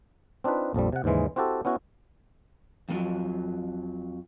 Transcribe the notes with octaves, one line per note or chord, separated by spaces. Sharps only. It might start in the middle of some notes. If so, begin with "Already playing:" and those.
C4 D4 D#4 F4 B4
A#1 F2 F3 G3
C3 F#5
D#2 G#2 C#3 E3 G#3
C4 E4 F#4 G4 A4
B3 C#4 E4 F#4
F2 B2 D#3 F3 F#3